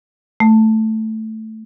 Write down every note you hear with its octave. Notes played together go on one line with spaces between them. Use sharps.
A3